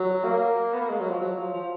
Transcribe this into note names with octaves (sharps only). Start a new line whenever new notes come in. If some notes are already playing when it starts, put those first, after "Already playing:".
Already playing: F#3
A#3
B3
A#3
G#3
F#3
F3
F#3
F3
F3